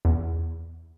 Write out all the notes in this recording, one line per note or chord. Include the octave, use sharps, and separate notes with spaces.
E2